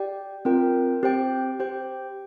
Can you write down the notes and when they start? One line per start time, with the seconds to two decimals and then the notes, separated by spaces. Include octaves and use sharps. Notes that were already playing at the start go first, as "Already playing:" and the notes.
Already playing: G4 D5 G5
0.45 C4 F4 A#4 G5
1.03 C4 G4 C5 G5
1.60 G4 C5 G5